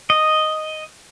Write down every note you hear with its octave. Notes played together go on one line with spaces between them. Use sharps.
D#5